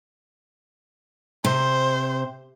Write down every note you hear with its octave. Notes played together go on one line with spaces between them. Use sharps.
C3 C5